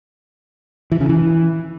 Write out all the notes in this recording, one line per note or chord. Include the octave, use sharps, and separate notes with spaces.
E3
C#3
E3